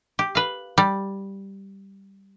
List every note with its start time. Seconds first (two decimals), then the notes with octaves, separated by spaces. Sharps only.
0.19 G4
0.35 B4 F5
0.78 G3